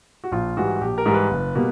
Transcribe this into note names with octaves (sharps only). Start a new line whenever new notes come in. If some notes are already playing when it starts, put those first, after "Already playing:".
F#4
A#1 F4
G#2 E3 G3 F#4
A#1 G4
A#4
G#2 E3 G3
B4
F#1
B2 G3 A#3